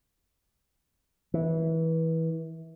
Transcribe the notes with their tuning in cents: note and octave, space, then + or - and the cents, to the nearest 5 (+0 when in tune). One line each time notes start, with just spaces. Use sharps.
E3 -25